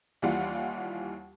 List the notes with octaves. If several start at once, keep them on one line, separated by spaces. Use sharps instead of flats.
D#2 E3 G3 F4 F#5